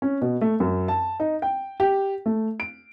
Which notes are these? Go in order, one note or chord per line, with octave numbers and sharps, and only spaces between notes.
C#4
B2
A3
F#2
A5
D#4
G5
G4
A3
D7